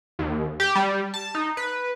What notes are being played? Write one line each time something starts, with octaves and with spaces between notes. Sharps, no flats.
D#2
G4
G3
A5
D#4
B4